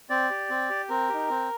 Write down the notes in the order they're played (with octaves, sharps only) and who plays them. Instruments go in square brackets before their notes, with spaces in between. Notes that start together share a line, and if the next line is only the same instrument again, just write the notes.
[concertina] C4 D5
G4
C4
G4
C4 A#4
D#4 G4
C4